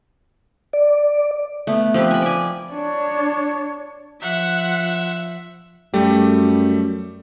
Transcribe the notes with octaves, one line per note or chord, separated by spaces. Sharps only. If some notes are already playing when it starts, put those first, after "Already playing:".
D5
A3 B3
F3 C4 G4 B4
G#5 B5
D5 G#5
D4 C#5
F3 E5 F#5
F#2 G3 A3 G4